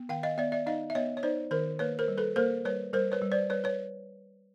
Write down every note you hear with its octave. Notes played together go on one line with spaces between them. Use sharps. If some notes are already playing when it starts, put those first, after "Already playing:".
Already playing: B3
D#3 F5 G5
D#5 F5
B3 D5 E5
D5 E5
D#4 D#5 F5
E5
B3 C#5 D#5
C#5
D#4 C5 D5
D#3 A#4 C5
A#3 B4 C#5
A#4 C5
G3
A4 B4
A#3 A#4 C5
G3 B4 C#5
G3 A#4 C5
B4 C#5
G3
C5 D5
G3 B4 C#5
B4 C#5